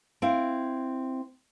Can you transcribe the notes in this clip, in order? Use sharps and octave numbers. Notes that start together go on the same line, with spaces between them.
C4 E4 F5